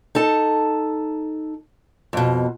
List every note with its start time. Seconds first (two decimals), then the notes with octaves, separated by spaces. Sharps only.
0.15 D#4 A4 A5
2.13 F2 B2